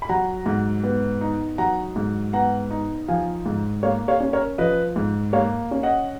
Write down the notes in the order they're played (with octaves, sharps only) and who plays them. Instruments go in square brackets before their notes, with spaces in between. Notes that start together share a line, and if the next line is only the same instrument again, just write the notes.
[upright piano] B5
F#3 F#5 A#5
G#2
B3
D#4
F#3 F#5 A#5
G#2
B3 F#5 A#5
D#4
F3 F5 G#5
G#2
A#3 C#5 F5
C#5 F5
C#4
A#4 C#5
F3 B4 D#5
G#2
A#3 C#5 F5
C#4
D#5 F#5